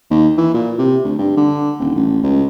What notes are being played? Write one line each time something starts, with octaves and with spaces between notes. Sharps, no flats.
D#2
E3
A#2
C3
D2
G2
D3
D#1
A1
C#2